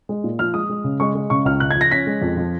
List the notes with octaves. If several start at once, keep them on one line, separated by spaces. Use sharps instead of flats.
G#3
A#2
F3 F6
G#3 D#6
G#3
C#3
G#3 C#6
G#3
C#3 C#6
C#2 F6
C#3 F#6
G#6
F3 A#6
C#4 B6
G#3
F2
F3